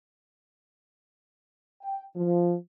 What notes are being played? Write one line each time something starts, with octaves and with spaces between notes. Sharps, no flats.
G5
F3